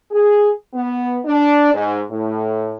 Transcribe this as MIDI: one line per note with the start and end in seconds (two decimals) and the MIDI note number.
0.11 0.49 68
0.74 1.18 59
1.25 1.73 62
1.74 2.00 44
2.11 2.78 45